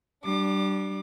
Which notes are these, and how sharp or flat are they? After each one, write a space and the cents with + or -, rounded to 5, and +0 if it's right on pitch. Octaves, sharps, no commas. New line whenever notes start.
G3 -25 D4 +0 D6 +30